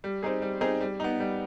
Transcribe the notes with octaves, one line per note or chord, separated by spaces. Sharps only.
G3
C4 D#4 G#4
G3
C4 D#4 G#4
G3
B3 D#4
G3